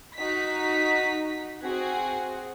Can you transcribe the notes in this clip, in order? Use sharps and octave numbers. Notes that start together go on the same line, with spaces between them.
D#4 F#4 B6
C4 F#4 G#4